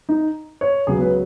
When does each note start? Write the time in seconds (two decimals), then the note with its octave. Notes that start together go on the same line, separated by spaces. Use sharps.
0.09 D#4
0.61 C#5
0.87 C#2 C#3 F#3 B3 G#4
1.01 B4